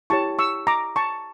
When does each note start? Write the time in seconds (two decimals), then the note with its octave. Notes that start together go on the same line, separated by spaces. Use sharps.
0.10 E4 G4 C#5 A5 C#6
0.39 C#6 E6
0.67 A#5 D6
0.96 A5 C#6